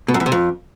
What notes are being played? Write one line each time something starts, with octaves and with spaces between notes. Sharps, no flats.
B2
F#2
E2
C3
F2